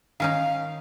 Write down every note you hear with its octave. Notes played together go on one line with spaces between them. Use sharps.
D#3 C#4 D#4 F5